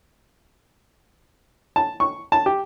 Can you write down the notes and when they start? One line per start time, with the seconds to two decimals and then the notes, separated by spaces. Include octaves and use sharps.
1.76 A5
2.00 C#6
2.32 A5
2.46 G4